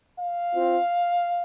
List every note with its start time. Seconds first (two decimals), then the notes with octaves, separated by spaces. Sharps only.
0.19 F5
0.52 C4 F4